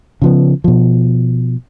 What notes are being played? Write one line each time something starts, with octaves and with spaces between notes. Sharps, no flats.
C#3 F3 B3
B2 F3